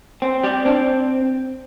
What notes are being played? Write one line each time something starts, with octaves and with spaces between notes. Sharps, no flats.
C4
G3 G4
C4 D4